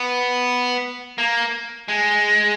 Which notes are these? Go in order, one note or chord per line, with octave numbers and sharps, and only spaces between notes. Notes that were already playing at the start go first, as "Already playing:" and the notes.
Already playing: B3
A#3
G#3